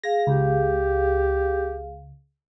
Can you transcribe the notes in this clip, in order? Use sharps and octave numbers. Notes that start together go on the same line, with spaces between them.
G#4 F5 A#6
C#2 G4